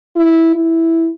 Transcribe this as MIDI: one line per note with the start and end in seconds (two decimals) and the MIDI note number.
0.16 0.53 64
0.55 1.09 64